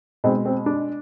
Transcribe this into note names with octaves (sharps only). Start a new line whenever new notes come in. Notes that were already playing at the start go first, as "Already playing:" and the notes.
B2 G#3 C4
C4
D4